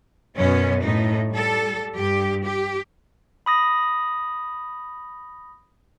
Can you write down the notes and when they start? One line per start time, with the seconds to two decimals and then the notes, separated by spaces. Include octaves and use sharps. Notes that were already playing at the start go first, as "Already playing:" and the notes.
0.37 F#2 B2 B3 C#4
0.82 A2 D#4
1.30 G3 A4
1.95 G2 G4
2.44 G4
3.46 B5 D#6 A#6